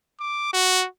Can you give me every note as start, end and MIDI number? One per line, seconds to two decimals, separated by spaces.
0.20 0.52 86
0.53 0.85 66